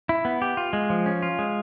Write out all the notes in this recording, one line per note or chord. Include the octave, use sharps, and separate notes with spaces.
E4
B3
G4
F4
G#3
F3
C#4
F4
G#3